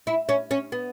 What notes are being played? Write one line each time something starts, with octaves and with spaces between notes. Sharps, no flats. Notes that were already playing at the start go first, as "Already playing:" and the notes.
E4
C#4
C#4
B3